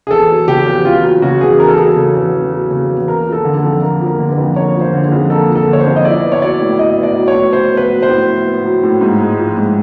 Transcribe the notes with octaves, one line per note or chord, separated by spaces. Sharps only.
G#4
E2 A4
F#3
C#3 G4
E2
E2 F4
F#3
C#3 F#4
E2 G#4
E2 A#4
A4
F#3 G#4
A4
C#3
E2
E2
F#3
C#3
E2
A#3 A#4
F3
A4
D3
A4
F2
A#3 A#4
F3
A#4
D3
B4
F2
A#3 C#5
F3
C5
D3
G#4
F2
A#3 A4
F3
A4
D3
C#5
C5
F2
D#5
E4 D5
B3
C#5
F#3 D5
A2
E4 D#5
B3
D5
F#3
C#5
A2
E4 C5
B3
B4
F#3
C5
A2
E4
B3
F#3
A2
G#2
G#3
F3
G#2